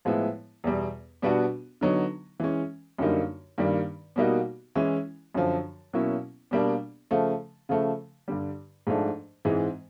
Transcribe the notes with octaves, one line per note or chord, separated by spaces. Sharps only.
A2 F3 G#3 B3 E4
E2 B2 G3
B2 G3 B3 D4 F#4
D3 F#3 B3 D#4
E3 G#3 C#4
F#2 D3 G3 A#3 D#4
G2 D#3 G3 A#3
B2 G3 A#3 D#4 F#4
E3 G#3 C#4 E4
F#2 D3 F3
B2 F#3 A#3 C#4 E4
B2 G3 A#3 D4
C#3 F3 A3
C#3 F3 A3
G2 D3 G3
G#2 F3 A3 D4
G#2 E3 G#3 C4